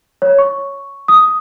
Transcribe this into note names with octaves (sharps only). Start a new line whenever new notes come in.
C#5
C#6
D#6